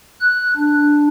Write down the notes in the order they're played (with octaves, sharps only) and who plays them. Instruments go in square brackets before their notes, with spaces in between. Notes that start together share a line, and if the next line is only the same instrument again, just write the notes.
[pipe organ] F#6
D4